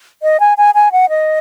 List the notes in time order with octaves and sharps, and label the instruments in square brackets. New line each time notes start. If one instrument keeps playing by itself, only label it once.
[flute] D#5
G#5
G#5
G#5
F#5
D#5